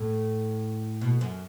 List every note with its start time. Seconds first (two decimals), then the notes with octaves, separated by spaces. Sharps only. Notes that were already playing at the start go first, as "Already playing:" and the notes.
Already playing: A2
1.01 B2
1.21 F#2